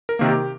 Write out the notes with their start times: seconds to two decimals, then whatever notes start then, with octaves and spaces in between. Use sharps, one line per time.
0.09 A#4
0.19 C3 D#3 A#3
0.29 G4